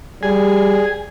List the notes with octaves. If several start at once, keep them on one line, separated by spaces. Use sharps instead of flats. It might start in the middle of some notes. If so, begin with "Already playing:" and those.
G3 G#4